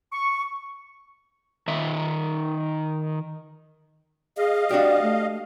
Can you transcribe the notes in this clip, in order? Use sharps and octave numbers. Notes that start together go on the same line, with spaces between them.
C#6
D#3 D#4 E5
G#4 D#5 F5
D4 F#4 G4 D5
A3